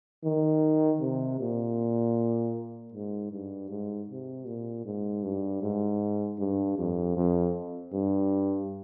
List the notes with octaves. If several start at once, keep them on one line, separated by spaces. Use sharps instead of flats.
D#3
C3
A#2
G#2
G2
G#2
C3
A#2
G#2
G2
G#2
G2
F2
F2
G2